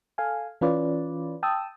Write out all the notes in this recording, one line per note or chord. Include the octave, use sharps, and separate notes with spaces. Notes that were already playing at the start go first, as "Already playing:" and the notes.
A4 F5 G#5
E3 C#4 F4 B4 D5
G5 A5 D#6 E6